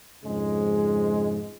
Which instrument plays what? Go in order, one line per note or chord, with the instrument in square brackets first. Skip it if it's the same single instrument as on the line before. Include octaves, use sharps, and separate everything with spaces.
[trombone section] F2 G#2 C#3 G#3